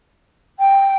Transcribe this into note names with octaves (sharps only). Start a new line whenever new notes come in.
G5